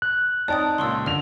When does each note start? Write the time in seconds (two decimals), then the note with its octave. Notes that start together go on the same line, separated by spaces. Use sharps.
0.02 F#6
0.48 C4 D#4 C#5 D5 G5 A5 D#6
0.78 C#2 A#2 C6 C#6 E6
1.06 D3 D5 F6 F7